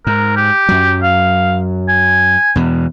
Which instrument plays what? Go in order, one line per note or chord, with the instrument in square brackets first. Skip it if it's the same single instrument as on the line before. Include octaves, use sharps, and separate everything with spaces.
[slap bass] G#2 [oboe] A#4
[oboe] G4
[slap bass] F#2 F#3
[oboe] F5
G#5
[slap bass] E2 B2